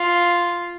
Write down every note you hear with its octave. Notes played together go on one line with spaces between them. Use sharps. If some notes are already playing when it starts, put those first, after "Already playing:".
Already playing: F4